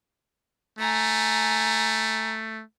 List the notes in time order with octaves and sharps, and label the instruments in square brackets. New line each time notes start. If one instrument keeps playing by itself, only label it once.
[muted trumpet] A3 [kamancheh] G#5 A#5